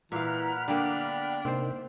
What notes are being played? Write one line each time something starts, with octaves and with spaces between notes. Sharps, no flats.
A#2 E3 F5 F#5 A#5 B5 F6
D3 A#3 B3 D4 G5
C3 A#3 C4 D#4 C5